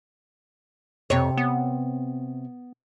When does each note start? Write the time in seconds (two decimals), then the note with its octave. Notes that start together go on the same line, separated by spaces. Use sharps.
1.10 F2 C3 C#5
1.37 B3